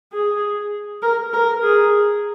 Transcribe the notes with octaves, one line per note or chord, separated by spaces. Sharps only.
G#4
A#4
A#4
G#4